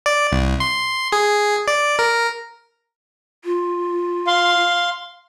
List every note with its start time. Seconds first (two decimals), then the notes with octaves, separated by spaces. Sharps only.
0.06 D5
0.32 C2
0.60 C6
1.12 G#4
1.68 D5
1.99 A#4
3.45 F4
4.27 F5 C6